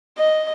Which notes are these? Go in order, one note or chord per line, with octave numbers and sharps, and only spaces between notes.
D#5